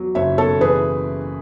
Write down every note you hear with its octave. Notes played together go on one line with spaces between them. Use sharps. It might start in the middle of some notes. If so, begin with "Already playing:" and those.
Already playing: E2 F#3
F#1 C#5 E5
B2 A4 C#5
E3 G#4 B4